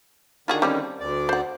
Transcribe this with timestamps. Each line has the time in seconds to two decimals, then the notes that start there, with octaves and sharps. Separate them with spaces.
0.48 D3 D#3 F4 F#4 G#4
0.62 G3 C4 C#4
1.00 D2 D5
1.29 C5 F#5